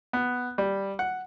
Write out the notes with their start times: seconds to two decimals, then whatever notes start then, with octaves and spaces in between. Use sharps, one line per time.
0.13 B3
0.58 G3
0.99 F#5